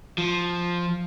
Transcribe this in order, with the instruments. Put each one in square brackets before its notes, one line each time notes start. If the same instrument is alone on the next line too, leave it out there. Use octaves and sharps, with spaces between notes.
[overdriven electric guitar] F3